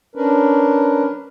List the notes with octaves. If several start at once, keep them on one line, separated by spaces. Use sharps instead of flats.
C#4 D4 A#4 B4